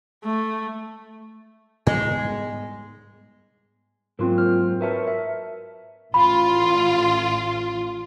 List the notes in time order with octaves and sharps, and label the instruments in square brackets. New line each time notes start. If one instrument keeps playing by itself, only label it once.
[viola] A3
[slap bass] G#2 G3 B3 [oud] G#3
[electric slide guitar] G#2 F#3 A#3 [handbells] C4 F4 A#4
[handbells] C5 F6
[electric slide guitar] F#4 B4 C#5 [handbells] A#4 E5 A5
[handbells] E5
[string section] A1 F4 [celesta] B5